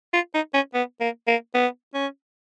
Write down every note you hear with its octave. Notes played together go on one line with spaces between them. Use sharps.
F4
D#4
C#4
B3
A#3
A#3
B3
C#4